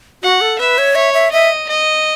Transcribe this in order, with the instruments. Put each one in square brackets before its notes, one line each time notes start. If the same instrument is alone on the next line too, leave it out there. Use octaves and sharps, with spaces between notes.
[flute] F#4 [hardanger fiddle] F#5
[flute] A4
[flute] B4 [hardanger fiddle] E5
[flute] C#5
[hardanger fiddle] C#5 [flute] E5
[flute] E5
[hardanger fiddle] D#5 [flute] E5
[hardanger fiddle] D#5